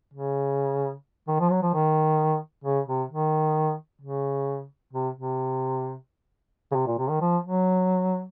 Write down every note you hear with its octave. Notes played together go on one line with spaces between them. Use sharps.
C#3
D#3
F3
F#3
F3
D#3
C#3
C3
D#3
C#3
C3
C3
C#3
C3
A#2
C3
D#3
F3
F#3